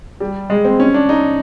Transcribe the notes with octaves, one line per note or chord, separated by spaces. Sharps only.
G3
G#3
C4
C#4
D4
D#4